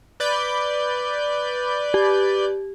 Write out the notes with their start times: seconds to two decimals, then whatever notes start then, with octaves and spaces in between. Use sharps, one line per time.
0.20 B4 D5 G6
1.94 G4